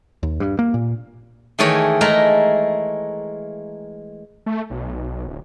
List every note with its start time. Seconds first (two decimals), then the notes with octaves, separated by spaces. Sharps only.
0.23 D#2
0.40 G2
0.59 A#3
0.74 A#2
1.59 D#3 E3 A3 G#4 C#5 D#5
2.01 G#3 A3 A#4 A#5
4.46 A3
4.70 B1
5.28 D1